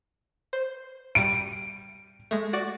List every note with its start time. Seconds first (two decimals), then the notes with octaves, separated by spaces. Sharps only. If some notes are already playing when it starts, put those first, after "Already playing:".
0.53 C5
1.15 G3 C#7 D7
2.31 G#3 A3
2.53 F#4 D5